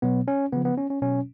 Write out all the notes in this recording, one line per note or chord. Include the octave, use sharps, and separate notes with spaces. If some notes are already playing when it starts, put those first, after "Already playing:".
B2 F#3 B3
C#4
C#3 F3 B3
B3
C#4
C#4
B2 F#3 C#4